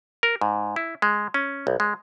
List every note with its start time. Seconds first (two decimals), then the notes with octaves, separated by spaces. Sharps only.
0.23 A#4
0.41 G#2
0.76 E4
1.02 G#3
1.34 C#4
1.67 B1
1.80 G#3